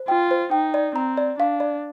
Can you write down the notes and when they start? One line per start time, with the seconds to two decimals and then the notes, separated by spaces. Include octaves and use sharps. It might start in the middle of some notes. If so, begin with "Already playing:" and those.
Already playing: C5
0.08 F4 G5
0.31 C5
0.51 D#4 G5
0.74 D5
0.95 C4 A#5
1.18 D5
1.38 D4 F5
1.60 D5